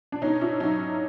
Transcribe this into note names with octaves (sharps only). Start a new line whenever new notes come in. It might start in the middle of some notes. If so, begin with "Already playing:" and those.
D4
B2 C#4 D#4
D4 E4
F#3 C#4 D#4